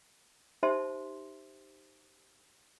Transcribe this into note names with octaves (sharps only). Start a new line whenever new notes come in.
D#4 G4 C5 E5 A5 C6